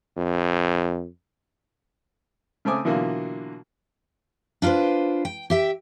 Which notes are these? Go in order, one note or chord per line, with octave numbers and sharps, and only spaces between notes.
F2
C#3 A3 C4 G#5 D6 D#6
B2 D3 E3 F#3 A#3 F4
D4 F4 F#4 B4 C5
G5
G4 E5 G5